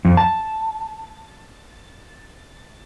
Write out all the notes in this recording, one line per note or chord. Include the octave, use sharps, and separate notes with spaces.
F2
A5